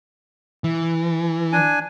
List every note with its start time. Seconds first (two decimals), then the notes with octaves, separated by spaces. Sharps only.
0.64 E3
1.52 D4 G#5